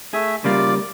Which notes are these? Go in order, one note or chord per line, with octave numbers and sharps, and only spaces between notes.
A3 G#4 E5
C#3 G3 A#3 F4 D5 D6